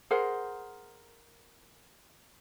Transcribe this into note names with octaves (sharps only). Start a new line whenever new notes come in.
G#4 A#4 C5 F#5